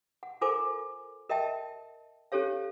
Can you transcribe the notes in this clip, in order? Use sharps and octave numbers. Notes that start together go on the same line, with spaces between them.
F#5
F4 A4 A#4 C5 G#5 D6
A#4 D#5 E5 G5 A5
C#4 G4 A4 C#5 F5